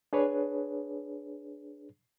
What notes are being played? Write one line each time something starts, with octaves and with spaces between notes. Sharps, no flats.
D4 G#4 B4 C#5